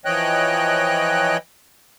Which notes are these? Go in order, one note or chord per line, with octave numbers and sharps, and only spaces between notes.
E3 F3 C#5 D#5 G5 F#6